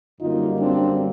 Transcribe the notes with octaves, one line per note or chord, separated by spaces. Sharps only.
F#2 D3 G3 A#3 D#4 F4
C4 D4